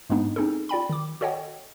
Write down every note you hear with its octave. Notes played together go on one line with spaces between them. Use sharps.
G#2 G#3 A#3 B3 D4 D#4
C4 C#4 D#4 E4 G#4 A4
F4 D5 G5 B5
D#3 D6
F#4 A4 C#5 D#5 F#5 G5